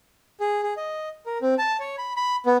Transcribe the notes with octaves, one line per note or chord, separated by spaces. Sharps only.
G#4
G#4
D#5
A#4
C4
A5
C#5
B5
B5
B3